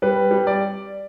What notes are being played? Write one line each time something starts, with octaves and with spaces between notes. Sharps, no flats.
G3 B4
G3
D5